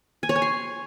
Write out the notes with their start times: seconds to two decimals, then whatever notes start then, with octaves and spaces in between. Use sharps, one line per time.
0.23 G#5
0.29 C#5
0.36 G#5
0.42 C6